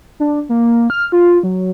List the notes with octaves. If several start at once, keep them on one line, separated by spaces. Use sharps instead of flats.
D4
A#3
F6
F4
F#3